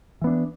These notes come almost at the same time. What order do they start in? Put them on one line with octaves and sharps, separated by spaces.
E3 B3 D4